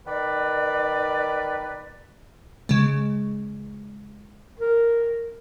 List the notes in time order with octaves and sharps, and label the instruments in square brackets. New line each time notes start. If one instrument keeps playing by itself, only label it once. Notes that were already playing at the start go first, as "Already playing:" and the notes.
[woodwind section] D#3 B4 D5
[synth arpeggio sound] C#3 G#3
[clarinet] A#4